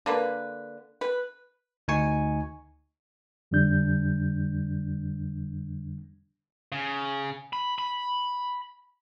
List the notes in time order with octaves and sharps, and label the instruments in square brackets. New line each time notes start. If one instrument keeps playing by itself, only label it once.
[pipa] D3 A#3 B4
B4
[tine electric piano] D2 D#4 G#5 C#6
[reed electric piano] F2 D3 G3 D4 G6
[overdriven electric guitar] C#3
B5
B5